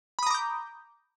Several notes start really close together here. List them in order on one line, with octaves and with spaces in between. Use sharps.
B5 D#6 A#5 D6 G6